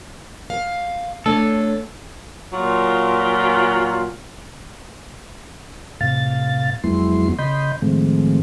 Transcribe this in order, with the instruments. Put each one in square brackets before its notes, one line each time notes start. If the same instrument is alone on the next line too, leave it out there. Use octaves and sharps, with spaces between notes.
[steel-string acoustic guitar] F5
[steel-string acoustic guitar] A3 D4 C#5 [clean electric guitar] A4
[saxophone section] A#2 F#3 F4
[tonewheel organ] A2 C3 F5 A6
F2 F#3 G#3 B3 E4 C6
C#3 D#5 B5 C6 G6
A2 D#3 F3 G#3 A3 C4